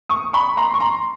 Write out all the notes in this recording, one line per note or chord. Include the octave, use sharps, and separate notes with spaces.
C#6 D#6
B5 C#6
A#5 C6
C#6
A#5 C6